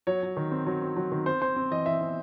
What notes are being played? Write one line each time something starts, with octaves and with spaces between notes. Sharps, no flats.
F#3 C#5
F#3
D#3
C4
F#3
C4
F#3
D#3
C4 C5
C4 C5
C4
E3 D#5
E3 E5
C4